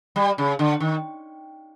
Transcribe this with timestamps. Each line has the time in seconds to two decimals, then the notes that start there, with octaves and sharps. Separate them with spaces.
0.16 G3
0.38 C#3
0.59 D3
0.80 D#3